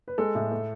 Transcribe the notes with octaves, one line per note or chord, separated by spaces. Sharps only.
B4
G#3 A4
A2
A3